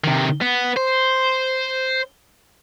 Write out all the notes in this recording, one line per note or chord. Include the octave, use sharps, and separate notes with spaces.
C3 D#3
B3
C5